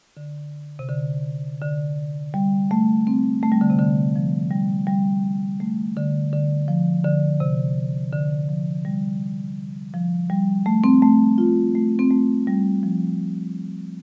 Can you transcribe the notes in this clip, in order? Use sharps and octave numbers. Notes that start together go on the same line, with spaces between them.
D3
C3
D3
D3
G3
A3
C4
A3
G3
D3
C3
D3
F3
G3
G3
A3
D3
D3
F3
D3
C3
D3
F3
G3
F3
G3
A3
C4
A3
F4
A3
C4
A3
G3
F3